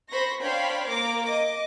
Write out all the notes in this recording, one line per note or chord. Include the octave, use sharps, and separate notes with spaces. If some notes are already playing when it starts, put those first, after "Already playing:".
C5 B5 C#6 A#6
D4 C5 C#5 F5 G5 B5
A#3 A#5 D6
D#5 D6